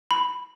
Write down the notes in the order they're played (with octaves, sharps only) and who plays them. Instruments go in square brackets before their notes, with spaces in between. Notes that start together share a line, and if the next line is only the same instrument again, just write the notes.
[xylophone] B5